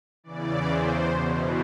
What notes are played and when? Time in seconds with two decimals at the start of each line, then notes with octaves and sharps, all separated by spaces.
0.24 E2 C#3 E3 D5
0.65 C5
1.07 E2 B2